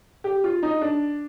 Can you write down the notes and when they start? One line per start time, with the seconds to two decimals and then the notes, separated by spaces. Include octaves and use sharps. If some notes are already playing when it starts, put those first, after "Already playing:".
0.24 G4
0.44 F4
0.63 D#4
0.81 D4